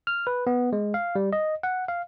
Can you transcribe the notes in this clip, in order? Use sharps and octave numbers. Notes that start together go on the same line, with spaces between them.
F6
B4
B3
G#3
F5
G3
D#5
F#5
F5